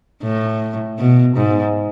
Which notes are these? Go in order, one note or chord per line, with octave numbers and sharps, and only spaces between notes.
A2
B2
G#2